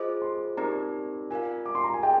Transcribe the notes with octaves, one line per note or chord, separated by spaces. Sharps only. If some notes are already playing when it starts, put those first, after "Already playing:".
Already playing: F4 G#4 C5 D#5 D6
C6
C4 D#4 G4 A#4 D5 A#5
F4 A#4 D5 F5 G#5
D6
C6
A#5
G#5
G#4 D#5 G5